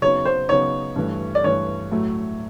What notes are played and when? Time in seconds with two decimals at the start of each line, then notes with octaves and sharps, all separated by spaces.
0.02 C#3 F#3 B3 D#4 C#5
0.25 C5
0.49 C#3 F#3 B3 D#4 C#5
0.96 G2 E3 A3
1.35 D5
1.44 G2 E3 A3 C#5
1.91 A2 F#3 A3